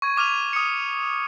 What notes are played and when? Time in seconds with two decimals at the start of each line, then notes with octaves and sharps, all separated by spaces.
0.02 C#6 G#6 D#7
0.17 C#6 D6 F6 D#7 F7
0.53 D#6 C#7